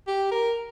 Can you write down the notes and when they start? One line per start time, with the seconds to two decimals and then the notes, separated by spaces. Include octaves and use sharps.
0.08 G4
0.31 A#4